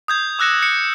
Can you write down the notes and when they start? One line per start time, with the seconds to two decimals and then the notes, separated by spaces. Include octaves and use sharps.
0.08 D#6 G6 G#6
0.39 D6 E6 F#6 A#6 C#7 E7
0.63 C#7